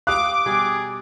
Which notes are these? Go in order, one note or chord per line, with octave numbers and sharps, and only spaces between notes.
G4 F5 D6 D#6 F#6
B2 G3 G#4